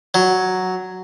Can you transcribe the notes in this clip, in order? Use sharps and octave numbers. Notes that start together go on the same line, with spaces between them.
F#3